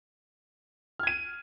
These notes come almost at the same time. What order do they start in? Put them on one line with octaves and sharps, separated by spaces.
F6 G#6 D#7